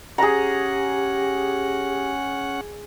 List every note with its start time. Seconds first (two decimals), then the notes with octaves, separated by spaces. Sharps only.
0.18 C#4 G4 G#4 F#5 A#5